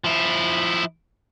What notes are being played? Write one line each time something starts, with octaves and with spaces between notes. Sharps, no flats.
F3 E4